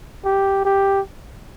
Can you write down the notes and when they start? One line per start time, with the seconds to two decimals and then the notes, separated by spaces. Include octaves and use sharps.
0.24 G4
0.65 G4